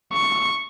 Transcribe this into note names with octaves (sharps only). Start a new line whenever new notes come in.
C#6